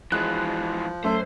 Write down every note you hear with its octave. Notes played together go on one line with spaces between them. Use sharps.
E3 F3 G#3 F#6
F#2 A3 C5